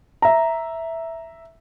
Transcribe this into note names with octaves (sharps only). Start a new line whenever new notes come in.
E5 A#5